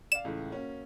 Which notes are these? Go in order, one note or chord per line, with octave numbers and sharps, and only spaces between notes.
D5 F5 E7
C#2 A2 E3
A#3 C#4 F#4